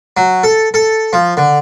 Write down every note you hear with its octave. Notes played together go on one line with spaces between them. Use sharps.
F#3
A4
A4
F3
D3